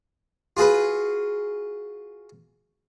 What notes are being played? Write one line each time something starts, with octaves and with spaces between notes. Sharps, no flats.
F4 F#4 G#4 B4